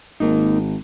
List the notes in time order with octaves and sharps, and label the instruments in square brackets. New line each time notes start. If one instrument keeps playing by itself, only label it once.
[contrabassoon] G#1 [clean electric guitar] A#3 D#4